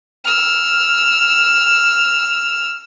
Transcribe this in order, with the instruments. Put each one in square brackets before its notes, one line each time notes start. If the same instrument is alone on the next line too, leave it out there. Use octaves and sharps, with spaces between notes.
[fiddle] E6 F6